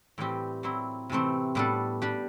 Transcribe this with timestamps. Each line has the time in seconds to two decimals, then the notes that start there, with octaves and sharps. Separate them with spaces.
0.18 A2 E3 G3 C4 G4
0.63 F#3 C4 E4
1.10 C3 E3 A3 C4
1.55 A2 G3 B3 D4 A4
2.02 G3 D4 G4